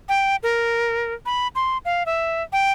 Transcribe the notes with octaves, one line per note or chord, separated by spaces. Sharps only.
G5
A#4
B5
C6
F5
E5
G5